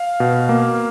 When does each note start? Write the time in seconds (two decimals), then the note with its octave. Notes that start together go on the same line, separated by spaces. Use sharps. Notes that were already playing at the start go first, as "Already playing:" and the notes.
Already playing: F5
0.20 B2
0.49 A#3